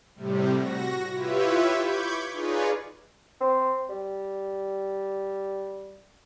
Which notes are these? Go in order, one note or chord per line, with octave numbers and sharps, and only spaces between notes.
A2 C3 G3
F#4 A#6
E4 F4 G4 B4 C#5 E5
B5 C#6 D6 G6 G#6
D#4 F4 G#4 B4 C#5 D5
C4
G3